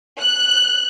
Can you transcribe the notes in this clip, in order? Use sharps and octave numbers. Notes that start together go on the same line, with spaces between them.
F#6